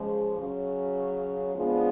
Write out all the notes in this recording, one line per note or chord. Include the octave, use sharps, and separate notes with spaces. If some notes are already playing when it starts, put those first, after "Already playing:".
Already playing: C#3 F3 G#3
C#3 F#3 C#4
F3 G#3 B3 D4